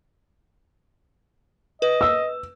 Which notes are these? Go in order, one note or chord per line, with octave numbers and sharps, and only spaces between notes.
B4 D#5
E6